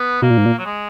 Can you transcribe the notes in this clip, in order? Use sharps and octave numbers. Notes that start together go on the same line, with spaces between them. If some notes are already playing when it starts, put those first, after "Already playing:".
Already playing: B3
B2 A#3
A#2
G#2
A#2
F#3
G#3